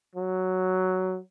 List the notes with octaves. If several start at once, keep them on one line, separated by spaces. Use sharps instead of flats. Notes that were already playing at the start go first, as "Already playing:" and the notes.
F#3